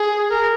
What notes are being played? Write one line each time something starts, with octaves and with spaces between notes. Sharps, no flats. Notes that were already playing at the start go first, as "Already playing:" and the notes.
Already playing: G#4
A#4